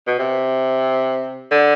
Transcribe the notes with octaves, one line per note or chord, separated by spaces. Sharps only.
B2
C3
D3